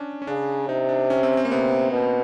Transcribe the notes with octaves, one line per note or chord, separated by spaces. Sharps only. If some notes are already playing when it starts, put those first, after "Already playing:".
Already playing: C#4 D4
C#4
C#3 D4
C3 D#4
D4
C#4
C4
C4
A#3
C3 B3
B2